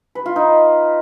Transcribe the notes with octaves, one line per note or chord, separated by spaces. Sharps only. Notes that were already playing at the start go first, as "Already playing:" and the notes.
B4
F4
D#4